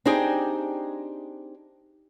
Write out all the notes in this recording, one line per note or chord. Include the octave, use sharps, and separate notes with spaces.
C4 D4 D#4 G4 G#4